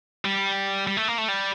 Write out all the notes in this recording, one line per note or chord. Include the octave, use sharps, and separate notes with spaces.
G3
G3
A3
A#3
A3
G3